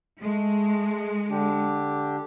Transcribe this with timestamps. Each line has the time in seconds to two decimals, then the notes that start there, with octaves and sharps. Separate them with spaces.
0.20 G#3 A3
1.30 D3 D4 G4